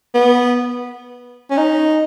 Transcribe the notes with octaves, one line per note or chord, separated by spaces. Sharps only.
B3
C#4
D#4